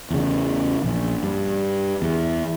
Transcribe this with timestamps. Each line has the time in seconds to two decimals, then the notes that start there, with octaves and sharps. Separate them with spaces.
0.10 E2 C#3
0.84 A#1
1.23 G2
2.02 E2